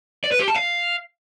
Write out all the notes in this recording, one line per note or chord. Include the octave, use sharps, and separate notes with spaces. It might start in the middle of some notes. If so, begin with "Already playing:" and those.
D5
B4
G4
A5
F5